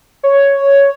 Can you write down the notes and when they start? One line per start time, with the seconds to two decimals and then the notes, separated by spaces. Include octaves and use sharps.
0.23 C#5